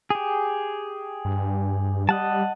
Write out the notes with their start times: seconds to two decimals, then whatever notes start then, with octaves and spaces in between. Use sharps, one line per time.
0.10 G4 G#4
1.25 G2
2.09 G3 D#5 F#5 A5